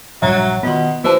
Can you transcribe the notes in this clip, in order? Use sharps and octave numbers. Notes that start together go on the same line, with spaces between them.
A#1 G2 F#3 E5 A#5
B2 D#3 B3 F4 C6
E3 A#3 F#4 C5 A5